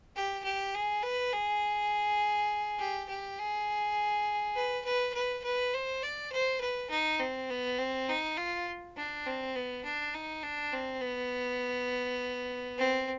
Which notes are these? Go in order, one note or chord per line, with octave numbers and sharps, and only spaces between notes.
G4
G4
G#4
B4
G#4
G4
G4
G#4
B4
B4
B4
B4
C5
D5
C5
B4
D#4
C4
B3
C4
D#4
F4
D4
C4
B3
D4
D#4
D4
C4
B3
C4